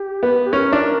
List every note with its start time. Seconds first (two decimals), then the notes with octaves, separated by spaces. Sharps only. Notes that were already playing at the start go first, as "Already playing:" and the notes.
Already playing: G4
0.23 B3
0.45 G4
0.52 C#4 A#4
0.73 D4